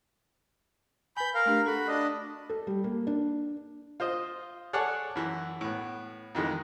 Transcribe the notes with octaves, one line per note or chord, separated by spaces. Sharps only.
B4 G#5 B5 G6
A#4 F5
A3 D4 G4
F#4 A4 B5
D4 D#5
A4
G3
A#3
D4
F4 C5 D#5
G#4 A4 C#5 D5 F#5
F#2 E3
A2 B3
F2 D#3 E3 G#3